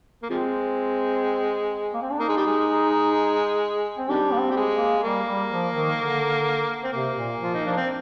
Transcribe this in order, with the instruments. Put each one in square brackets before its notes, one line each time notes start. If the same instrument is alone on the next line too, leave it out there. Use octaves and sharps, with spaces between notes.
[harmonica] A#3
[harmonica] C3 F3 G#3 [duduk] C4
[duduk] A#3
C4
D4
[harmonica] A#3 [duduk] D#4
[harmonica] G#3
G3
G#3
[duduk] C4
[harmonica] C3 D#3 G3 [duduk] D4
[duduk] A#3
C4
[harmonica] G3
G#3
[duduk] A#3
[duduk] G3 [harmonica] A#3
[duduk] G3
F3
D#3
D3
[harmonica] C4
[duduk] C3 [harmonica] A#3
[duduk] A#2
[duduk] F3 [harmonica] F4
[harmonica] D#4
[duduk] F3 [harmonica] D4
[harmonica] C4